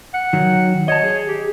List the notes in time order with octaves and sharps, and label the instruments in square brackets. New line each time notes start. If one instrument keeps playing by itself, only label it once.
[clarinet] F#5
[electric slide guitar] D#3 F#3
[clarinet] C#5 [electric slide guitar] D#5 A5
[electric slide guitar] G#4
[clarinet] G4